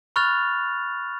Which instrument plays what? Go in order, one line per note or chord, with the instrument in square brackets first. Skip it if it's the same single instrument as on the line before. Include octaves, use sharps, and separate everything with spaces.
[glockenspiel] B5 C#6 F6 F#6 A6 F7